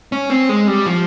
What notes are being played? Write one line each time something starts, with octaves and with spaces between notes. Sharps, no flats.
C#4
C4
G#3
G3
F3